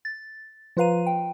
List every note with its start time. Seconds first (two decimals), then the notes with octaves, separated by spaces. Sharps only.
0.05 A6
0.77 F3 F4 B4 F5 A#5 D#7
1.07 G5